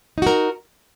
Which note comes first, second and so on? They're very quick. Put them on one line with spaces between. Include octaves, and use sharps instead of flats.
D#4 F#4 A#4